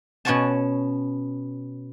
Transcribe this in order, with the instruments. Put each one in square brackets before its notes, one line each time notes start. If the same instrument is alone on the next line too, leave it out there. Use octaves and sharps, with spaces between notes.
[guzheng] B2 C#4 C#5 F#5 G#5 A5